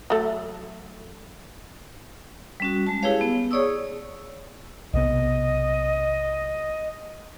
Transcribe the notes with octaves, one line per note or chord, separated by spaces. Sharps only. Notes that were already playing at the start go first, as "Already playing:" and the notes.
F#3 A3
G3 C#4 F#4
G#3 A5
E4 G4 G#4 B4 C#5 F5
B3
G#4 C#5 D5 C#6 D#6 E6
B1 C3 B3 D#5